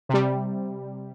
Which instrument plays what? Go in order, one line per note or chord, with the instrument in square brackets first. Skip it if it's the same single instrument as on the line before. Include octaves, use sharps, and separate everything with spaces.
[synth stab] C3 G3